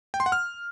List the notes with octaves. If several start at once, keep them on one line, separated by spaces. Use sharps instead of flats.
G5
C6
F#5
F6